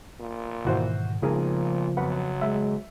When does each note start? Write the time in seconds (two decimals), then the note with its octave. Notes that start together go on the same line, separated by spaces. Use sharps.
0.20 A#2
0.65 G#2 B2 D#3 E3 F#4 C5
1.22 G#1 A#2 C#3 F3 B3 G#4 A#4
1.97 F2 F#3 B4 F#5
2.41 G#3 E5